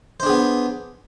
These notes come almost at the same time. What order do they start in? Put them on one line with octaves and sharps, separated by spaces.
C5 D4 G#4 B3